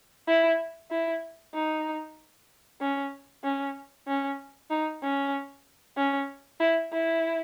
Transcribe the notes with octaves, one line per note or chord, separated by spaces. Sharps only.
E4
E4
D#4
C#4
C#4
C#4
D#4
C#4
C#4
E4
E4